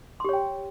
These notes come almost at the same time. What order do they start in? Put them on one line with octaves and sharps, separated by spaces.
C6 G4 C#5 G5